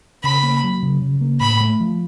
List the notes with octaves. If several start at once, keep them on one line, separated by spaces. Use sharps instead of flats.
C#3 B5
A#3
F#3
C#3
C#3
A#3
A2 B5
A3
F3